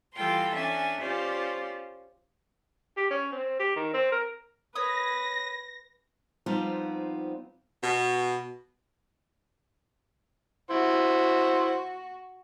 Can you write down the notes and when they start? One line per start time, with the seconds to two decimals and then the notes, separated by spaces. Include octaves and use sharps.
0.16 E3 G3 F4 A4 G5 C6
0.55 C#4 D4 E5 G#5
1.00 C#4 F4 G4 C5 D5
2.97 G4
3.11 C#4
3.32 C4
3.59 G4
3.76 D#3
3.94 C4
4.12 A#4
4.75 B4 C#5 D#6 A#6
6.46 F3 G3 B3 C4 D#4 F4
7.83 B2
10.71 E4 F#4 C5